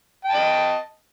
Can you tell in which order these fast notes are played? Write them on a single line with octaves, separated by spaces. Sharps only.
G5 A5 D#5